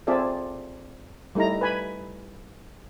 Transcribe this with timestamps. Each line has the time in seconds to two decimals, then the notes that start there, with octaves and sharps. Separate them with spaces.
0.07 C4 F4 G#4 A4 D5 E5
1.35 G3 A3 D#4 E4 A#5
1.61 B4 G#5 B5